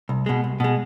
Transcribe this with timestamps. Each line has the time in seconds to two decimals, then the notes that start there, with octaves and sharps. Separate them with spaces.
0.09 C2
0.26 B2 G#3
0.44 C2
0.60 B2 G#3